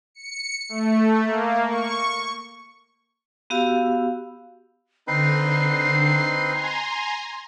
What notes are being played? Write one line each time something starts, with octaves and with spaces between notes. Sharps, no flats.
C#7
A3
A#3
C#6
B3 F#4 G4 F5 E6
D3 C4 D#4 B4 C7
G#5 A#5 C6